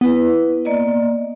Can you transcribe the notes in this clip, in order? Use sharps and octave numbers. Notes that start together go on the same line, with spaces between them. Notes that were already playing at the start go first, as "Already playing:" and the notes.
B3 E4 B4
A#3 D5 D#5